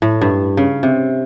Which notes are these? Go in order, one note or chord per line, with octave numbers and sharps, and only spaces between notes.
A2
G2
C#3
C3